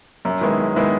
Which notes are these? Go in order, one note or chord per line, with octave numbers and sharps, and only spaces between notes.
F#2
D#3 G#3 B3 E4
F#2
D#3 G#3 B3 E4